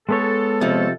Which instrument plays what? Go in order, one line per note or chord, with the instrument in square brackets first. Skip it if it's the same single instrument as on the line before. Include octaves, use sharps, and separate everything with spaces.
[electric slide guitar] G#3 B3 C#5 [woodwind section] A4
[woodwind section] F2 A4 [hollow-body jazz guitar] C3 F3